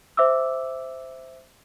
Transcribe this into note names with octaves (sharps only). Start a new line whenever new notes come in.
C5 E5 D6 E6